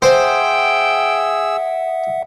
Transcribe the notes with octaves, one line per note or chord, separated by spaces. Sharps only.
G#4 C5 E5 F#5 G5 E6